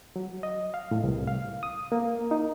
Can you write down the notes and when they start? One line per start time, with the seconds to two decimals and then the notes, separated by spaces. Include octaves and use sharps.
0.16 F#3
0.43 D#5
0.74 F5
0.91 A2
1.04 C2
1.27 F5
1.63 D#6
1.92 A#3
2.31 D#4